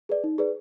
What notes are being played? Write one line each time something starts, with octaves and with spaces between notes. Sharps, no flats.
G#4 B4 D5
D#4
G#4 B4 D5